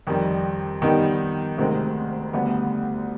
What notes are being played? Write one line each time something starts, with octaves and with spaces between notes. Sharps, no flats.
F2 D#3 G3
D#3 G3 B3 D#4 G4
D2 C3 D#3 G#3 C4
D2 D3 G3 B3